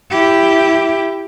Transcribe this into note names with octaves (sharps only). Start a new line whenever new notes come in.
E4 G4